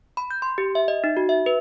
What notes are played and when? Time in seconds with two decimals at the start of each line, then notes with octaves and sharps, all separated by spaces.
0.17 B5
0.31 G6
0.42 C6
0.58 G4
0.75 E5
0.88 D#5
1.04 D#4
1.17 F#4
1.29 E5
1.46 B4